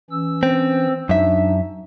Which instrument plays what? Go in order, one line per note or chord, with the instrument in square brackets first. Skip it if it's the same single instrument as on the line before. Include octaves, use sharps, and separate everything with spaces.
[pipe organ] E3 C#4 E6
[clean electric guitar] C4
[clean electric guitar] F#2 E5 [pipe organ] D4 D#4